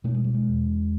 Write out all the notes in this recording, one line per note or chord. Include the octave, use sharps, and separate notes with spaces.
B2 A3
G#3
G3
G#3
E2